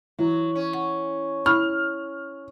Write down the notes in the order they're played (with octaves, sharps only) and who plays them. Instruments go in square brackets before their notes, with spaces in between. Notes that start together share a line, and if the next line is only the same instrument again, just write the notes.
[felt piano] E3 [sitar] F#3
[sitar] C#4
[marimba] F#5 C#6
[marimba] E4 B5 C#6 [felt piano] F6